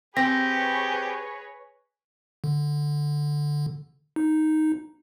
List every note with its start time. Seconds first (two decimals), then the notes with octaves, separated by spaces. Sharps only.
0.17 C4 G4 G#4 B4 C#5 A#6
2.44 D3
4.16 D#4